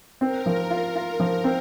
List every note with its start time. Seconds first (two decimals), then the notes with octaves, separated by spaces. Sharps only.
0.21 C4 A#4
0.46 F3
0.70 F4
0.95 F4 A#4
1.20 F3
1.44 C4